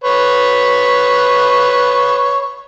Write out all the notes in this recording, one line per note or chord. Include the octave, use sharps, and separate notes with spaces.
B4 C#5